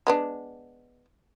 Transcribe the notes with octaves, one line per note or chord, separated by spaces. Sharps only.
G#3 B3 D4